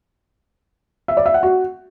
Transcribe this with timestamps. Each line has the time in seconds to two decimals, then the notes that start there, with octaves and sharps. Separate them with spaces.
1.08 E5
1.17 D5
1.26 E5
1.34 F#5
1.43 F#4